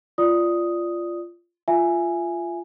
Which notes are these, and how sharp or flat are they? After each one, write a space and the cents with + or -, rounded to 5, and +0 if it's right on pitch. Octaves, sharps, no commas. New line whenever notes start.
F4 -15 D5 +0 D#6 +0
F4 -15 E5 +20 G#5 +0